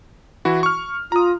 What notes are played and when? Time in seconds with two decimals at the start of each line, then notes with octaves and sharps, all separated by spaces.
0.45 E3 E4 F#4
0.63 C#6 F6
1.12 F4 A#5 D#6